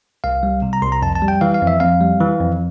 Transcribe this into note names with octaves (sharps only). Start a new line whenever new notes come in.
C2 F5
G3
C3
A#5
C2 C6
A#5
F2 A5
A5
G3
G5
E3 F5
F5
F2
E5
F2 F5
G3
E3
F2